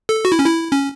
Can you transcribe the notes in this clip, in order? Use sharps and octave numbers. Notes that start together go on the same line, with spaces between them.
A4
F#4
E4
C#4
E4
C#4